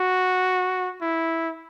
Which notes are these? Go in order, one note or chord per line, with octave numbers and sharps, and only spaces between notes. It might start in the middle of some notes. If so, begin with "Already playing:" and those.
Already playing: F#4
E4